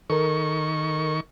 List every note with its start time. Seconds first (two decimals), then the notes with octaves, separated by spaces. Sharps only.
0.10 D#3 A4 A#4 C#6